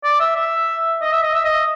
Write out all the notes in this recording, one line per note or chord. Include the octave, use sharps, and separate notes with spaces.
D5
E5
E5
D#5
E5
D#5
E5
D#5